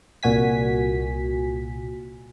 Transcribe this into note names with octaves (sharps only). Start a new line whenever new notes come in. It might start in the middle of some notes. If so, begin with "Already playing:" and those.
C2 A#2 F#4 G#5 B6